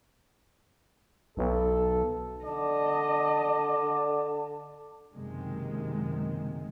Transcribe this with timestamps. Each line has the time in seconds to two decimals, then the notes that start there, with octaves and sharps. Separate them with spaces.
1.37 B1 A4
2.45 D3 D5 D#5 A5
5.13 F#1 C3 D#3 G#3